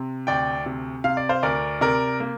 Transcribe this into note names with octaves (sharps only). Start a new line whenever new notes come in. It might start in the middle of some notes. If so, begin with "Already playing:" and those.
Already playing: C3
D2 D5 G5
C3
C3 F5
D5
C5 F5
D2 A#4 D5
C3 A#4 D5
A#3